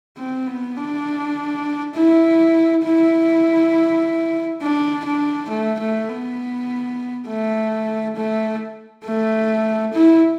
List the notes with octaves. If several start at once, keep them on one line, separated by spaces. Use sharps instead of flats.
C4
B3
D4
E4
E4
D4
D4
A3
A3
B3
A3
A3
A3
E4